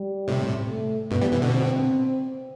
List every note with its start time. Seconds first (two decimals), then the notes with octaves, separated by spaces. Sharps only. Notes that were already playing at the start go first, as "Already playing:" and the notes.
Already playing: G3
0.28 A2 C3
0.69 A3
1.11 G2 B2 B3
1.21 E3 G3
1.32 C3 E3
1.42 B2 D3
1.52 C4